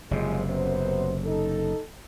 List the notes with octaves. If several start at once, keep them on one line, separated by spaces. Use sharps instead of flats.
F#1 C3 F3 G#3
F#2 B3 C5
D#4 A4